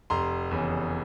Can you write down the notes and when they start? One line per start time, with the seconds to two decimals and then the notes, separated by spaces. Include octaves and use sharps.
0.10 F1 A#5 C6
0.51 E2 C#3